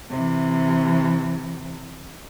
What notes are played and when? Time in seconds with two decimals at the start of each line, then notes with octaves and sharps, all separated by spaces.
0.10 C3 E3